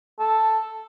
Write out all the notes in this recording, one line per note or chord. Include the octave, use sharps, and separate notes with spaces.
A4